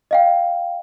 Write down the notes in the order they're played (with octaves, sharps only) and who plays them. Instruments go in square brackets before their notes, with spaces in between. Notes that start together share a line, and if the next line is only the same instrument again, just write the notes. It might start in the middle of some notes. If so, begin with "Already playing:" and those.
[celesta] D#5 F5 G5